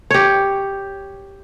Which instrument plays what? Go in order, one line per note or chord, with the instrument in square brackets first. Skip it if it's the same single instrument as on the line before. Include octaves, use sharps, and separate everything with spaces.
[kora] G4 C#5